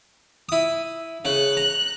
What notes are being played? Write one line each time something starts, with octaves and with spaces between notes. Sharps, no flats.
E4 D#6
C#3 F#6
A#5